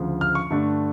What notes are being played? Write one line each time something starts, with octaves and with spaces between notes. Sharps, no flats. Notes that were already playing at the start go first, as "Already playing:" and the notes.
Already playing: D2 C#3 F3
F6
C#6
G2 D3 A3 D4